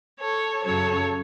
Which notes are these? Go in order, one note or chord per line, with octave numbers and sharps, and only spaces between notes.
A4 C#5
F#2 C#3 F#3 A4 C#5